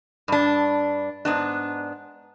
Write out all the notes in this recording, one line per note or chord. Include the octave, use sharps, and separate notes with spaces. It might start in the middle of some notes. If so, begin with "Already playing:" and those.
G2 D4
G#2 B3 D4